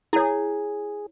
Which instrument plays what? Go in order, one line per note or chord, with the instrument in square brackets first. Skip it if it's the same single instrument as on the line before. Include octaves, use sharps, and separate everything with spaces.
[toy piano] E4 C#5 [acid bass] G#4